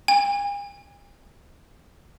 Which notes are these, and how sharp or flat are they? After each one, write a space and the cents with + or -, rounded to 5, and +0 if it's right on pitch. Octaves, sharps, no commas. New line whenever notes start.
G#5 -45